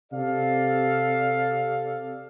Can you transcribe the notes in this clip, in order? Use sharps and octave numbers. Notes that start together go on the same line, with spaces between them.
C3 A4 D5 F5